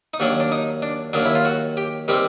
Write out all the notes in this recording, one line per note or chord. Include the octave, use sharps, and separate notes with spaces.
D#4
D#2 D#3 F#3 D4
D4
D#4
D4
D#2 D#3 F#3 D4
E4
F4
F#4
G4
D#3 G3 C4 G4